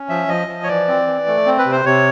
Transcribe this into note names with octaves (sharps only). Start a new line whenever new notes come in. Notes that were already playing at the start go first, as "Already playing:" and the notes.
Already playing: C#4
F3 E5
F3 D#5
F3
C#5
E3 D5
C4
E3
A3
C4
B4
C3
C5
C3 C#5